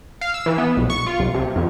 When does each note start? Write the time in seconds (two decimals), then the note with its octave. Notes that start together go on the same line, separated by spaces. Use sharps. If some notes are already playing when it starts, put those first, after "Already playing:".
0.21 F5
0.34 E6
0.46 E3
0.58 B3
0.77 B1
0.90 C#6
1.06 F4
1.20 C2
1.34 C3
1.56 F2